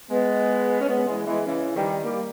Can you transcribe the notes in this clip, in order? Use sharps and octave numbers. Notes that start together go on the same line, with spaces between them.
G#3 B3
C#4
G#3 B3
E3 G#3
E3 G#3
C#3 E3
D#3 G3
G3 A#3